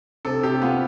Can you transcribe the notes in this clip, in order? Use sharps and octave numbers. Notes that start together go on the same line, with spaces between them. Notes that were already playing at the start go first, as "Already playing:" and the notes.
C3 A4
C3 G4
B3 F4